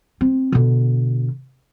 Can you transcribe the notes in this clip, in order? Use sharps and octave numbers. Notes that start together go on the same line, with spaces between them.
C4
B2 D3